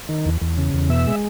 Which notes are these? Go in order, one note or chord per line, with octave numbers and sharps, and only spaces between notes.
D#3
E2
E2
C#3
E2
B2 E5
G#3